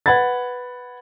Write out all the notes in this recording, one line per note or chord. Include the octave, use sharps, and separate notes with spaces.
B4 F#5 B5 G#6 A6